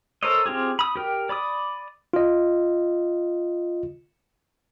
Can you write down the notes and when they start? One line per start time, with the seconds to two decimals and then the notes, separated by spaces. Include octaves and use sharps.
0.23 A4 A#4 C5 C#5 D#5
0.46 C4 F4 G4 G#4
0.79 B5 D#6
0.96 G4 A#4 G5
1.29 D5 B5 D6 D#6
2.13 F4 D#5